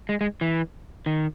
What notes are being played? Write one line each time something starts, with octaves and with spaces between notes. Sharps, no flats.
G#3
G#3
E3
D#3